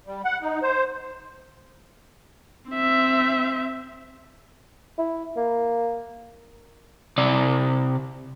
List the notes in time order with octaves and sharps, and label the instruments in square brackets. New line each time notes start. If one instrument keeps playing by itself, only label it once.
[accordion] G3
F#5
D#4
C5
[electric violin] C4 E5
[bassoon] E4
A#3
[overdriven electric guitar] C3 D5